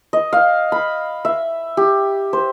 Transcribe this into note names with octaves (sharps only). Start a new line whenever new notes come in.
D#5
F5
B5
E5
G4
C5